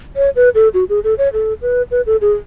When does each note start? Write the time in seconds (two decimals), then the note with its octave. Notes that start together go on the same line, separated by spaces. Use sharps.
0.16 C#5
0.36 B4
0.55 A4
0.74 F#4
0.89 G#4
1.04 A4
1.18 C#5
1.33 A4
1.62 B4
1.91 B4
2.06 A4
2.21 G#4